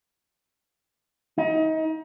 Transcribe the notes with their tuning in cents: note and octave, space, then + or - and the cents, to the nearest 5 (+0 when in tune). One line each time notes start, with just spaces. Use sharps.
D#4 +30